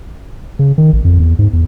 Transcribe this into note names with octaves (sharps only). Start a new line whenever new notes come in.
C#3
D#3
A1
F2
E2
G#2
E2